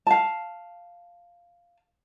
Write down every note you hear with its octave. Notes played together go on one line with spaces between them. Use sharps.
F5 A5